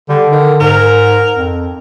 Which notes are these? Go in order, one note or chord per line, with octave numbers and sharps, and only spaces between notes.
D3 G3
D#3
G#2 A#4
F2